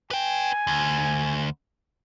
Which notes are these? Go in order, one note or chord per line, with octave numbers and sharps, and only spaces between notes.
B4 G5 G#5
D2